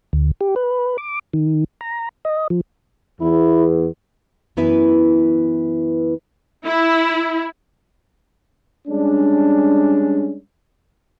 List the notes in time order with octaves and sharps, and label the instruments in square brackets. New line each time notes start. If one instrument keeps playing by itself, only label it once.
[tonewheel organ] D2
G4
B4
D6
D#3
A#5
D#5
F3
[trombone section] E2 [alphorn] E4
[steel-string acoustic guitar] F#2 E3 B3 E4 B4 E5
[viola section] E4
[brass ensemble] G3 G#3 C#4 D4